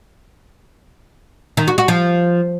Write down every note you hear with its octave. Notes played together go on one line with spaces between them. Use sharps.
D#3
F#4
F#4
F3